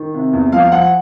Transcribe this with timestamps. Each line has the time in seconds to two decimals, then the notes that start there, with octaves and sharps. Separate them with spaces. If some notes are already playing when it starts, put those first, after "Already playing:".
Already playing: D#3
0.14 C3
0.33 E2
0.52 F3 F5
0.72 F3 F#5